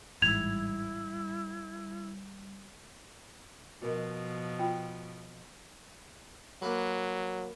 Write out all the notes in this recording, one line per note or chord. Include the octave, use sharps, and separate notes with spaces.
A1 G#2 G3 E4 G#6 F7
B2 F3 F#4 A#4 D#5
F4 G5 B5
F#3 A#3 A#4 B4